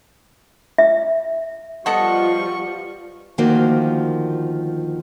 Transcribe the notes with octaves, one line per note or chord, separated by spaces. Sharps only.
E5
F3 G3 B3 F4 A4 D#5 F#5 C#6
D2 D#3 F3 A#3 F#4 C5